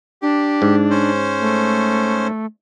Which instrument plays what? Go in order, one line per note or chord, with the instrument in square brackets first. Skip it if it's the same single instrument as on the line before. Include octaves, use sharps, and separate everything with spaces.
[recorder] D4 [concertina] G4
[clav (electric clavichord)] G#2
[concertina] C#4 C5
[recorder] A3